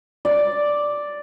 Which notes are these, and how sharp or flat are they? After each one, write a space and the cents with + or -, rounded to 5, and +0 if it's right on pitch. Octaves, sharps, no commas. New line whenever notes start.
D5 +0